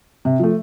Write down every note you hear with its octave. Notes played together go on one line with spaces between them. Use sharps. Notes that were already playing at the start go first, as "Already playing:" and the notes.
C3
F3 A3